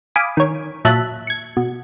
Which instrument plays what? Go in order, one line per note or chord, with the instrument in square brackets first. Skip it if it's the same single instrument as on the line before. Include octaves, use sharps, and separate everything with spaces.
[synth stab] F5 G#5 B5 D6 D#6
D#3 C#5
A#2 F#3 E5 A5 F#6 B6
G#6 C#7
B2